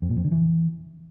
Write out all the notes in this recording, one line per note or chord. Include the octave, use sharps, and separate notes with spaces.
F2
A#2
F2
D3
E3